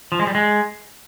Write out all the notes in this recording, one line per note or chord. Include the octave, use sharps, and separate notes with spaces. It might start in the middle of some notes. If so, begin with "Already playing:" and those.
F3
G#3
G3
G#3